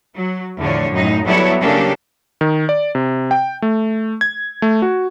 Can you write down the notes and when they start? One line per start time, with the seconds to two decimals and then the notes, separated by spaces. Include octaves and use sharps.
0.15 F#3
0.59 E2 A2 D3 F3 C#5
0.92 F#2 A2 D#4
1.25 F#3 G3 B3 E4 A4 C#5
1.61 C#3 F#3 A#3 D4 G4 A4
2.41 D#3
2.69 D5
2.95 C3
3.31 G5
3.62 A3
4.21 G#6
4.62 A3
4.82 F#4